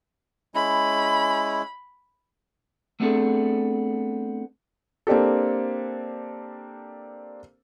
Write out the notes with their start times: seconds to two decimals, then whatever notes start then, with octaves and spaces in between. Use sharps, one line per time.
0.55 G#3 C#4 E4 B5
3.00 A3 B3 C4 D4 G#4 A4
5.07 A#3 C4 D4 G4 A4